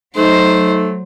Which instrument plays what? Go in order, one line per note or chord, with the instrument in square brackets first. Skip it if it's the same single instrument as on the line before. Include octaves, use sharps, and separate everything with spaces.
[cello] F#3 [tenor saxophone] A3 [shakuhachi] D#4 [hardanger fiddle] C5